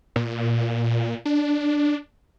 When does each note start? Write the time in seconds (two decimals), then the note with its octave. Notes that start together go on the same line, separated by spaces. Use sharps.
0.16 A#2
1.25 D4